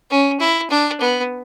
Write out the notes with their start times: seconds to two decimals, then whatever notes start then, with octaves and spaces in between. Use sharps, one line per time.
0.10 C#4
0.40 E4
0.70 D4
1.01 B3